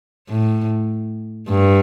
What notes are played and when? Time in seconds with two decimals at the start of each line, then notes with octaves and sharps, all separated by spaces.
0.29 A2
1.49 G2